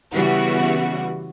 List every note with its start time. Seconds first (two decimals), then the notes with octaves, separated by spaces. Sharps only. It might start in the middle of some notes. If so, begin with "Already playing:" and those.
0.13 C#3 E3 G3 B3 F#4